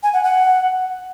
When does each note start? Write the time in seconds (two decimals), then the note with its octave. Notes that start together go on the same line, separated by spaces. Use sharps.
0.03 G#5
0.13 F#5
0.24 F#5